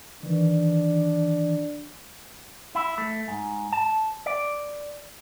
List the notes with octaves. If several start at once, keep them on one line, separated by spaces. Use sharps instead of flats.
D#3 E3 D4
E4
A3
G#2
A5
D5